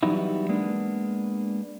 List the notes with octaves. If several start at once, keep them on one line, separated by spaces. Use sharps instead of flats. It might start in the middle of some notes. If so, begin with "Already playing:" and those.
E3 F#3 G3 B3 D#4 E4
G#3 A#3 B3 D4